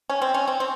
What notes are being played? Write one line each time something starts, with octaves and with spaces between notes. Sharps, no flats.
C#4
C4
C#4
C4
C4